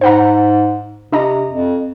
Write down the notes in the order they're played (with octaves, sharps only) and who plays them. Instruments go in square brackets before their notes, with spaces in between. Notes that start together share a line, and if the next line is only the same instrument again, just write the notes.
[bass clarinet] G#2 [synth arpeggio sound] C5 F#5 A#5
[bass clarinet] C3 [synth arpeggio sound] D4 D#5 A#5
[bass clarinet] F2